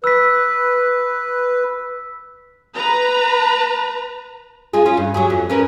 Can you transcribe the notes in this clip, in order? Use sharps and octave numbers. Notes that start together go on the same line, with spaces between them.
B4 E6 B6
B4 A#5
G#3 F4 G#4
C#4 F4
G2
F#3 G4 G#4
F2
C#4 A#4 B4